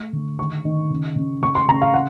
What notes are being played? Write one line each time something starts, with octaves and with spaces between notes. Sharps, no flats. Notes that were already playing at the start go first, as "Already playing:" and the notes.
Already playing: A3 C#6
D3
D#3 C#6
D#3
C#3
C#3
C#3 C#6
C6
C#3 A#5
F5
F#5